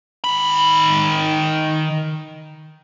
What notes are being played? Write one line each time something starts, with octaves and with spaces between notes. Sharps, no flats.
D#3 B5